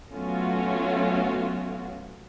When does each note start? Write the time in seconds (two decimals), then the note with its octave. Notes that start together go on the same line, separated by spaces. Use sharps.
0.12 F#3 A3 B3 C#4 F4 F#4